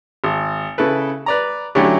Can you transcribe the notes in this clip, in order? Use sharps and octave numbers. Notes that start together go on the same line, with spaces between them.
G#1
C#3 E4 A4 B4
B4 D5 A#5
D3 F#3 A3 C#4 E4 G4